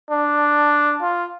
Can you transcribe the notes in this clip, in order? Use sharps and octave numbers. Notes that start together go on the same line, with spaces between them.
D4
F4